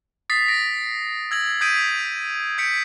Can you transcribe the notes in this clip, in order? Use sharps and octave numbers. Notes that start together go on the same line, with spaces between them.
D#6 A6 B6 C7
A#6 D7
E6 G#6 A#6 F#7
D#6 G6 G#6 B6 D7 D#7
G6 G#6 B6 C#7 D7